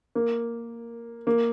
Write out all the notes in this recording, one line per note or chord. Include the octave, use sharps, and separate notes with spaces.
A#3
A#3